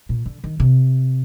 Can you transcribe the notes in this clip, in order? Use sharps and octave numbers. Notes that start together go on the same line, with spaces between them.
A#2
D3
D#3
C3